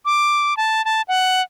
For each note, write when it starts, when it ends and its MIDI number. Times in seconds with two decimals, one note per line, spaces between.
0.05 0.57 86
0.57 0.84 81
0.85 1.02 81
1.08 1.42 78